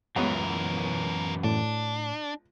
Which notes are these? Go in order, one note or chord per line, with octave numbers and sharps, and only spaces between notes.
C#2 F#2 B2 E3 B3 A#4
A2 D4